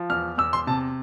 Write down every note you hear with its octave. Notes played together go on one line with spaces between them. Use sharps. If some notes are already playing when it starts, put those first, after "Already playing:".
Already playing: F3
E2 F6
E2 E6
C6
C3 A5